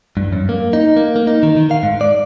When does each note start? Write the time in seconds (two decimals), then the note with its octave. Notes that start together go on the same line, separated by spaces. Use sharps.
0.17 G2
0.33 F#2
0.49 A#3
0.73 D#4
0.97 A#3
1.16 A#3
1.27 D#4
1.43 D#3
1.57 D#3
1.71 F5
1.83 G#2
2.01 D5